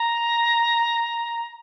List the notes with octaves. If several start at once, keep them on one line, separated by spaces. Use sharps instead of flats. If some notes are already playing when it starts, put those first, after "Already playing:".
Already playing: A#5